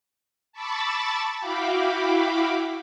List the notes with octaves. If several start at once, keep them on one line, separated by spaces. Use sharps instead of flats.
A5 B5 C#6 D6 E6 A6
E4 F#4 F5 G5 B5 D6